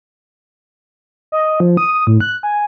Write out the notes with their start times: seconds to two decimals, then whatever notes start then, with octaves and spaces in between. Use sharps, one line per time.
1.32 D#5
1.60 F3
1.77 D#6
2.07 A2
2.20 F#6
2.43 G#5